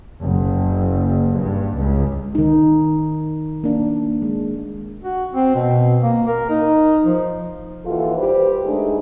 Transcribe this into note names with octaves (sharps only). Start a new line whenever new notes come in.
F#1
G2
C#2
D#3 D#4
A#3 D4
G#3
F#4
C4
B2
A#3
A#4
D#4
F3
D#2 E3 F4 F#4 A4
G3 G4 B4 C5
D3 G#3 A3 D4 D#4 G#4